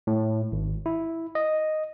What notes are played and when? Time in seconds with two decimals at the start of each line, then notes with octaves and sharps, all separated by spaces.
0.07 A2
0.52 G#1
0.86 E4
1.35 D#5